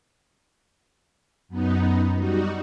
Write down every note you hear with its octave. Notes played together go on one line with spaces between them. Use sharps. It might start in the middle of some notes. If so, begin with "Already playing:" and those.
F#2 B3 D#4
G3 D#4 F#4